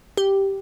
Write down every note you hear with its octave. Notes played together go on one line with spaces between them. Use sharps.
G4